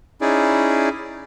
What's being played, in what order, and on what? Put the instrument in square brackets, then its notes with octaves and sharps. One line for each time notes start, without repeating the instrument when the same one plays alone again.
[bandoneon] C#4 D#4 E4 G#4 D5